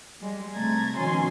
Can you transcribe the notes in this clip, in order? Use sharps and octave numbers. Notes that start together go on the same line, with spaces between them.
G3 G#3
C3 A3 A#5 G#6 A6
B2 D#3 F3 C#4 G#5 C6